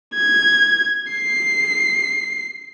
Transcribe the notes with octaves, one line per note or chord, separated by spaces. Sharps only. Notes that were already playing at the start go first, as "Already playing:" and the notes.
G#6
C7